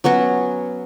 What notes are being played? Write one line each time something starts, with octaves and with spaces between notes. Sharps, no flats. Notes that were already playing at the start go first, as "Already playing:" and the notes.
F#3 B3 C#4 F#4